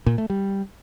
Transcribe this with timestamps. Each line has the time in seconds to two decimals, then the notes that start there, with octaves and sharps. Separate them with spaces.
0.06 A#2
0.18 A3
0.30 G3